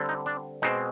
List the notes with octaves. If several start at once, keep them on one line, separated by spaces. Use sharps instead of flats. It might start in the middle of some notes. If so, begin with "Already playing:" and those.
Already playing: D3 G3 C4
D#4
D4
B2 G#3 C4 D#4